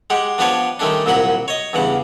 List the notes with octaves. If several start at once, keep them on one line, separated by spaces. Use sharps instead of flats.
G#3 G4 F#5
F3 B3 D4 G4 B4 C#5
D#3 G3 A3 C#4 D4
C2 A#2 F#3 F#4 F#5 B5
C#5 D#5
E2 G2 C#3 F#5